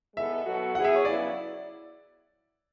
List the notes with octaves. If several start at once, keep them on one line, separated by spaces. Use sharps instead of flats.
G#3 B3 E4 A4 E5
B2 F#3 B3 F#4 A4
E3 B3 E4 G#4 F#5
E5
C#5
C#3 F#3 B3 E4 D5